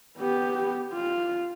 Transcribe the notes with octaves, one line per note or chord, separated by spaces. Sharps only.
B3 G4
F4